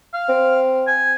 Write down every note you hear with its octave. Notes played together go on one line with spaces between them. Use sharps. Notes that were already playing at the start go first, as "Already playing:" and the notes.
F5
C4
G#5